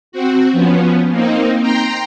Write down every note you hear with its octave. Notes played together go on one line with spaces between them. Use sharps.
C4 F#4
F3 B3 C#4
A#3 C4 D#4
G5 A#5 C6